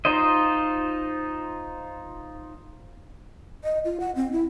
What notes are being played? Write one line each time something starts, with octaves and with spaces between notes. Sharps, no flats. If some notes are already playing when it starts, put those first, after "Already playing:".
D#4 F4 C5 D#5
D#5
F4
F#5
C4
E4